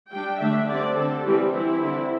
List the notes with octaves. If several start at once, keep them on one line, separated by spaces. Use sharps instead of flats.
G3 D4 G5
D3 A3 D4 E5
D3 G3 C4 D5
D3 C4 A4
E3 G3 C4 G4
E3 C4 E4
D3 C4